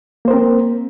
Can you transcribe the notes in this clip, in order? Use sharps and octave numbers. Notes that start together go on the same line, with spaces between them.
A#3 C4 A#4 C5